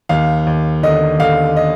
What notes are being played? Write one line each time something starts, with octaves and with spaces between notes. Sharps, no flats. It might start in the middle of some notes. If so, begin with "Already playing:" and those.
D#2 F5
D#2
D3 D#5
D3 F5
D#5